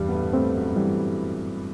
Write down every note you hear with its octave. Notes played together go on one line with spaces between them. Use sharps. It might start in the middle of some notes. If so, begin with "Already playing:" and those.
Already playing: E2 G2 G3
B3
A2 A3
A2 A3 C4
F#2 F#3
E3 G3